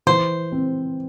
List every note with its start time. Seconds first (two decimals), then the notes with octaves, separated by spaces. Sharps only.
0.07 E3 C5
0.52 C4